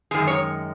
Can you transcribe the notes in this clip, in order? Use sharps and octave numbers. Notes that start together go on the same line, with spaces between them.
F#2 D#3 G#3 G#4
C#5